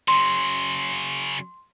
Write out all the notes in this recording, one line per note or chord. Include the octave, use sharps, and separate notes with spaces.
C#3 F#3 C6